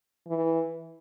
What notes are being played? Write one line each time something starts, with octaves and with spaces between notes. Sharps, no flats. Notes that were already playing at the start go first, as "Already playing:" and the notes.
E3